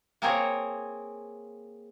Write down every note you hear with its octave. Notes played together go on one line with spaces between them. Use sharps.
A#3 C4 G#4 A#4 C#5